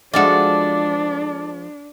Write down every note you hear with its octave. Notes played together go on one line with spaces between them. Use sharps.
F3 G#3 D4 F#4 A4 D5